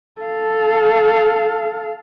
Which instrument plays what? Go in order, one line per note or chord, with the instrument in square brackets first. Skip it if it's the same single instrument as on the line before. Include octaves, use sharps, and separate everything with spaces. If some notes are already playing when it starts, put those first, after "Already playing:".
[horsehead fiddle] A4 F5